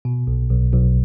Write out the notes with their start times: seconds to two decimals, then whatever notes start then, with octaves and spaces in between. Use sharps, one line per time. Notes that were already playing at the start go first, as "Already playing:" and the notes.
0.05 B2
0.27 B1
0.49 B1
0.72 B1